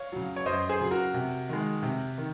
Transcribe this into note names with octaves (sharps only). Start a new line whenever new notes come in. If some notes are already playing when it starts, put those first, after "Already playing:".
Already playing: C#5 F5
C#3 F#3
C#5
F#2 C5 D#5
G#4 C5
C#3 F#3
F#4 A#4
C3
D#3 G#3
C3
D#3